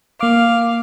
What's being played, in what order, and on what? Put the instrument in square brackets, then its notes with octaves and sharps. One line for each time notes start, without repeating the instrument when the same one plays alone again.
[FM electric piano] A#3 D6 [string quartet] F5